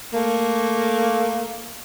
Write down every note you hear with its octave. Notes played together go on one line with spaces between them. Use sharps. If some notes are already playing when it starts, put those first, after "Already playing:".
A3 A#3